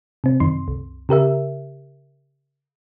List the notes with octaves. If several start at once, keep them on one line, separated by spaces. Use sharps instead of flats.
C3 C4
F#2 D#3 C6
C2
C#3 G4 A#4 E5